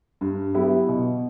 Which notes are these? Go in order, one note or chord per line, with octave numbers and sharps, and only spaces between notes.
G2
F#3 B3 E4 G4
B2